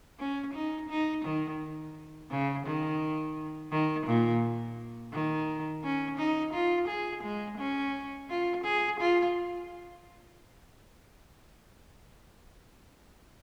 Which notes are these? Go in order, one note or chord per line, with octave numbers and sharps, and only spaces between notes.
C#4
D#4
D#4
D#3
C#3
D#3
D#3
A#2
D#3
C#4
D#4
F4
G#4
G#3
C#4
F4
G#4
F4